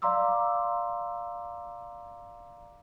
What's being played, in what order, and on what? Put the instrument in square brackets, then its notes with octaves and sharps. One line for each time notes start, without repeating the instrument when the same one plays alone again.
[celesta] D5 F5 A#5 C6 D6 E6